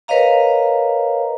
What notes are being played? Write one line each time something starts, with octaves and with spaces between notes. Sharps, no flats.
A#4 B4 C#5 D#5 F5 A#5